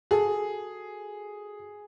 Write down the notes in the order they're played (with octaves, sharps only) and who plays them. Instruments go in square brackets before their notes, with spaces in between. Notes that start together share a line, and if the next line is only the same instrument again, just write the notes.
[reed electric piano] F#4 A4 [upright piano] G#4